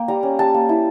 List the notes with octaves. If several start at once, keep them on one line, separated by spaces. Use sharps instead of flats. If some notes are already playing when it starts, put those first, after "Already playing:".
Already playing: A#3 G5
G3 A#5
C#4
G3 A5
A#3
E4